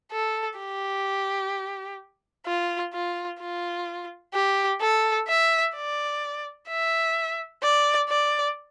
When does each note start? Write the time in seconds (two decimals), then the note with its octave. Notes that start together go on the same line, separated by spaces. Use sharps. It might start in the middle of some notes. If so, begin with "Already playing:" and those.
0.12 A4
0.59 G4
2.46 F4
2.94 F4
3.40 F4
4.34 G4
4.81 A4
5.28 E5
5.75 D5
6.68 E5
7.63 D5
8.09 D5